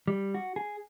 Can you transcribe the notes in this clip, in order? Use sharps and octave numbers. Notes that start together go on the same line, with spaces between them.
G3
F#4
G#4